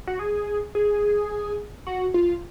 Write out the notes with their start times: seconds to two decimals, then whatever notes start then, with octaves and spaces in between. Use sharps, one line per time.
0.07 F#4
0.19 G#4
0.75 G#4
1.87 F#4
2.14 F4